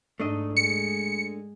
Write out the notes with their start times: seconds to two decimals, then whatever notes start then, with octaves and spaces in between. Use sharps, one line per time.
0.20 G#2 A3 D4 D#4 D#5
0.57 G#3 C#7